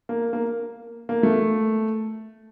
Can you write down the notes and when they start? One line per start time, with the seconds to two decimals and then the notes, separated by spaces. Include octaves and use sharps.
0.09 A#3
0.33 A#3
1.09 A#3
1.23 A3